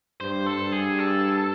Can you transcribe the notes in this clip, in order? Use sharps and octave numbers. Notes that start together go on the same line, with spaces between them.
G2 C5
A4
G2
G#4
A4